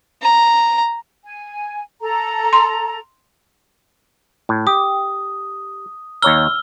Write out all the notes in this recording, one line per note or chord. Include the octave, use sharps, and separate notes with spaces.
A#5
G#5
A4 A#5
C6
A2
G4 D#6
D#2 C#5 A#5 E6 F6 G7